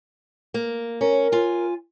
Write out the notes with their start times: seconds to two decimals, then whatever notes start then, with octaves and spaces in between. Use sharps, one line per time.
0.54 A#3
1.01 C#4 A#4
1.32 F4 G#5